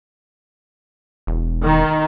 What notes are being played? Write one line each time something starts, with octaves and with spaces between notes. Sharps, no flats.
E1
D#3